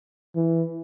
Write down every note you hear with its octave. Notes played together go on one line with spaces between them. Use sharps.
E3